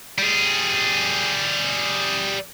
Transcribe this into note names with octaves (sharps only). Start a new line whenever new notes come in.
G3 G#4